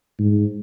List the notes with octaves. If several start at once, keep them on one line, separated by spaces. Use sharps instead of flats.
G#2